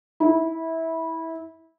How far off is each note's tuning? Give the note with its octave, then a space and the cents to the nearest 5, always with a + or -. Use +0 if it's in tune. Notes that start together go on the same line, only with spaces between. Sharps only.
E4 -20